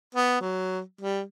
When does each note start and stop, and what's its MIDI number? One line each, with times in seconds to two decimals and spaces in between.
0.15 0.40 59
0.41 0.80 54
1.01 1.21 55